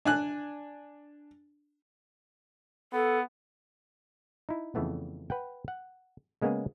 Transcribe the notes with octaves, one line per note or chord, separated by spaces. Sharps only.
D4 G#5 F#6
B3 A4
D#4 E4
F2 C#3 E3 A3 B3
B4 F#5 G5
F#5
C#3 G#3 A#3 B3 C#4 G#4